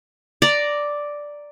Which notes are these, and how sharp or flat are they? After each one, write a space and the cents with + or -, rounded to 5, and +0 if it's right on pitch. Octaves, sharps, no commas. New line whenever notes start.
D5 +0 A#5 -5